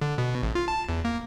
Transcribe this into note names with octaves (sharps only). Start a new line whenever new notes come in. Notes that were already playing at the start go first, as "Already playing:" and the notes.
D3
B2
A1
F4
A5
E2
A#3